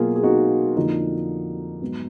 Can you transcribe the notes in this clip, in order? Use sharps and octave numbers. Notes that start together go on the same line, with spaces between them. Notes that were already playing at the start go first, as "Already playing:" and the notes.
Already playing: B2 F#3 A#3 F4 G#4
G#4
D#4 F#4
F2 D3 F3 A#3 D#4
G#2 F#3 B3